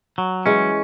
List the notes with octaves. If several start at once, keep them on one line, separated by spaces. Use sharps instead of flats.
F#3
E3 G#3 C#4